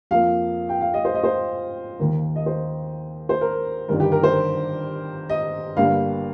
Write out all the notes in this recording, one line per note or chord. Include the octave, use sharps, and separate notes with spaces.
F2 F3 A#3 F5
G5
F5
D#5
C5
D#5
C5
D#2 D#3 A#3
D#5
C5
C5
A#4
G1 G2 D#3 G3 A#4
G4
A#4
C5
D#5
G1 G2 G3 A#3 F5